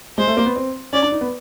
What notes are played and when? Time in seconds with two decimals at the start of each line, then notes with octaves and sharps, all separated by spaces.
0.18 G#3 C5
0.28 A3
0.37 A#3
0.46 B3
0.56 C4
0.93 C#4 D5
1.03 D4
1.12 D#4
1.21 B3